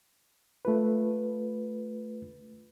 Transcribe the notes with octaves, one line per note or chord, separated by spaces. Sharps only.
A3 F4 B4